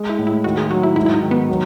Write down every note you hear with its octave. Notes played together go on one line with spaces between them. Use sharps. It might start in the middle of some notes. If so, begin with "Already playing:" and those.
Already playing: G#3
E4
A2
E4
D#3 F#4
G#4
F#3 F#4
E4
G#2 E4
E4
D#4
D#3
B3
F#3